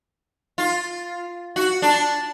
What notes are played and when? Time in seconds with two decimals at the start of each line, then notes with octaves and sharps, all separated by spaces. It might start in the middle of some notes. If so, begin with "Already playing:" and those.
0.58 F4
1.56 F#4
1.82 D4